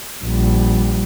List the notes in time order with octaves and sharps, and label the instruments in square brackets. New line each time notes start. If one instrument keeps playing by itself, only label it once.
[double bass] A#1 G3